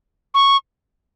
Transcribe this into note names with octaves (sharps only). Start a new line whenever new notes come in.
C#6